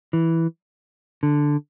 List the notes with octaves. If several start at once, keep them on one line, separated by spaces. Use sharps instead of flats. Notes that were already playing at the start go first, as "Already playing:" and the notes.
E3
D3